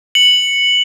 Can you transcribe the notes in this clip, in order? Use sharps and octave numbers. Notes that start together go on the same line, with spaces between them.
C#7 F#7